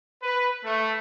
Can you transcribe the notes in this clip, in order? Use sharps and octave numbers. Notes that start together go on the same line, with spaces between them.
B4
A3